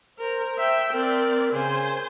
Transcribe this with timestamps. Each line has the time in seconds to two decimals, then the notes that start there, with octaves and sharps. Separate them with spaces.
0.19 A#4 C5
0.59 E5 G5
0.93 C4 A#4 D5
1.53 C#3 C5 G#5